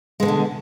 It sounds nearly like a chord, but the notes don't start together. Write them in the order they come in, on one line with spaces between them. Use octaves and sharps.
G#3 E3 D3 B2